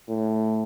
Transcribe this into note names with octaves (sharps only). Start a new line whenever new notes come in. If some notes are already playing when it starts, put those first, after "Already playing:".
A2